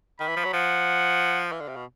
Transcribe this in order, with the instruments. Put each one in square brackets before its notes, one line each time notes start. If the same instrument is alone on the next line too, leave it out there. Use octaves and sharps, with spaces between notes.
[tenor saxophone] D#3 [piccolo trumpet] B5
[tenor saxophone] E3
F3
F#3
[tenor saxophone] F3 [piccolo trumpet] F#5
[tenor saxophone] E3 [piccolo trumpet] F5
[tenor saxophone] D3
C3
B2